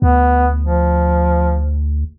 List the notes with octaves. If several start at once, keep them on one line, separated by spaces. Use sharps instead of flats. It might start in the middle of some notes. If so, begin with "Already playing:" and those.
D2 B3
F3